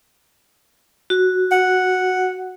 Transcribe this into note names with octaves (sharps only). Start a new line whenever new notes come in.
F#4
F#5